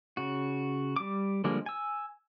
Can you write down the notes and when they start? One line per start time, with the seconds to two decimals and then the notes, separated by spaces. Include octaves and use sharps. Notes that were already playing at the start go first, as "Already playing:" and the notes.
0.17 C#3 F#4
0.96 G3 D6
1.44 D3 F3 G3 G#3 A#3
1.66 G#5 E6